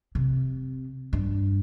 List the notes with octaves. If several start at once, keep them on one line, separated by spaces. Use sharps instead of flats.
C3
G2